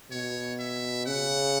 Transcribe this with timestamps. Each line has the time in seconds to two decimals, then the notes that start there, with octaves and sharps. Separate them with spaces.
0.11 B2 C#5
0.60 E5
1.06 C#3 F#5